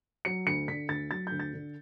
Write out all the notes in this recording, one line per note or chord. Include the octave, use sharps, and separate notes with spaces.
F#3 C#7
D2 C#7
D3 B6
D2 A6
F#3 A6
D2 G6
A6
D3